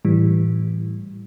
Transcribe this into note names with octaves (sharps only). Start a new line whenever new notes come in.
A2 E3 G3